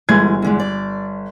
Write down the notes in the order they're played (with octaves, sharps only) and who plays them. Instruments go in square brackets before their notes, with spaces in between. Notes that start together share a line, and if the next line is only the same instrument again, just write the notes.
[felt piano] G1 G#6 [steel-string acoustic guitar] E3 F#3 G#3
[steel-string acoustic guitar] E2 D3 G#3
D5